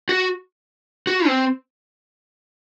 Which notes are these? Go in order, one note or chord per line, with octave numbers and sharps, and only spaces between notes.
F#4
F#4
C4